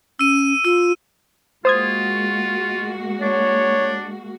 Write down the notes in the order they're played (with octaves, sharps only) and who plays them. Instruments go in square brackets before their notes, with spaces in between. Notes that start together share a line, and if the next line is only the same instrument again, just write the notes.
[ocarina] C#4 [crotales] E6 D#7
[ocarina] F4 [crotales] E6
[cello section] G#3 A#3 F#4 [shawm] F4 [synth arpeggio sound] C5 D#6 G#6
[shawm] D4 [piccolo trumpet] C#5